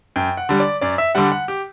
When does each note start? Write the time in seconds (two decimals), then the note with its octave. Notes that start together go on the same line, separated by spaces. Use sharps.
0.16 F#2 G5
0.37 F#5
0.49 D3 G3
0.60 D5
0.81 F#2 D5
0.98 E5
1.15 D3 G3 F#5
1.32 F#5
1.48 G4